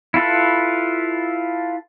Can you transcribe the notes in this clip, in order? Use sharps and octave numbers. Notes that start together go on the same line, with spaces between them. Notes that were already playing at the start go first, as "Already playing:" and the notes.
E4 F4 A4 B4